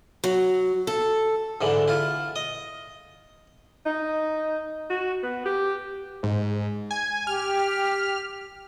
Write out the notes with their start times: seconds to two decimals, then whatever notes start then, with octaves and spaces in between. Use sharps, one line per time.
0.24 F#3
0.87 A4
1.61 G#2 D3 E3
1.88 E4 F4
2.36 D#5
3.86 D#4
4.90 F#4
5.23 B3
5.45 G4
6.23 G#2
6.91 G#5
7.27 G4 F6